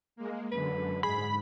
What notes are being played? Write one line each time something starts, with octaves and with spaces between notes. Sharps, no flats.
G#3 A#3
F#2 D3 B4
G#2 G#4 B5